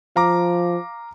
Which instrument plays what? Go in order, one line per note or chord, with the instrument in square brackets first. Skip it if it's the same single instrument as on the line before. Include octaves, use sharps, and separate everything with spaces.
[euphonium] F3 [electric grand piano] F5 A#5 D6